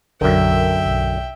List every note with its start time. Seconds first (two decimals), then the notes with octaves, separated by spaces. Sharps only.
0.21 B1 F#2 D3 A#4 E5 G5
0.86 B1